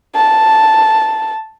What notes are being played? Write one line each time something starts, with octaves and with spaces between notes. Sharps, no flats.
A5